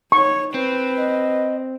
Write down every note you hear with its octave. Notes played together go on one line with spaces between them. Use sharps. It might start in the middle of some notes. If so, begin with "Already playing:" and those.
D#4 C#5 C#6
C4 B4
D#5